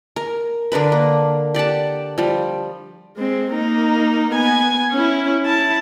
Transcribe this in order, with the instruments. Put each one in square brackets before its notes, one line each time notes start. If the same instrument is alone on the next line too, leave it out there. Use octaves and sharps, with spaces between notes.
[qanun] A#4
D3 D4 A#4 B4
A#3
G4 D5 F#5 A5
F3 G3
[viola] G#3 C4
A#3 D#4
B3 G#5
C#4 E4
E4 A5